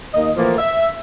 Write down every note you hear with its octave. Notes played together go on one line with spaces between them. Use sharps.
D#2 A#3 D#5
A2 E3 F3 A#3
E5